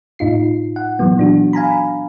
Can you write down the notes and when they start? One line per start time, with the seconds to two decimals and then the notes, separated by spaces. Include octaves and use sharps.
0.19 A2 D#4 F4 C7
0.76 F#5
0.99 A#2 E3 F#3 B3
1.17 E3 D4 F#4
1.53 F5 G#5 A#5 B5